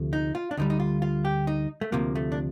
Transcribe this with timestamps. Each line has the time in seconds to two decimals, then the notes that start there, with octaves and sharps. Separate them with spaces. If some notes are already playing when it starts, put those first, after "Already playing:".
Already playing: D2 C3 F3 A3
0.13 D#4
0.35 F4
0.51 D4
0.57 D2 D3 G3 D#4
0.70 D#4
0.80 F4
1.02 F4
1.25 G4
1.47 D#4
1.81 A3
1.92 D2 C3 F3 A#3
2.15 A3
2.32 D4